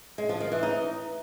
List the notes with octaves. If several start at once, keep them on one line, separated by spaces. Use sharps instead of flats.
G#3
F3
D#3
E3
D#4